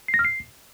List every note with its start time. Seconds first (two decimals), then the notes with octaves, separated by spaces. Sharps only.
0.08 C7
0.14 A#6
0.19 F6
0.25 C7